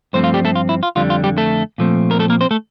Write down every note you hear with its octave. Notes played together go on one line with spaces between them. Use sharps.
G2 F3 A3 C4 C5
F4
G3 G4
A3 A4
F4
E4
F4
F2 D3 G3 F4
F4
G3 G4
A3 A4
A#2 F3 A3 C4
A#4
A3 A4
A#3 A#4
C4 C5
A3 A4